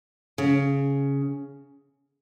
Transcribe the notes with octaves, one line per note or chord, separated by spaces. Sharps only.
C#3